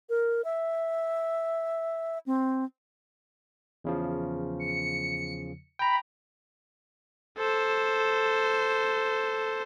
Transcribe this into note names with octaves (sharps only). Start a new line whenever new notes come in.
A#4
E5
C4
E2 C#3 F3
C#7
G5 A#5 B5
A4 C5